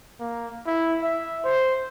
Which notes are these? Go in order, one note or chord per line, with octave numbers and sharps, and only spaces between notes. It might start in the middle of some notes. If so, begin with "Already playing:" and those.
A#3
E4
E5
C5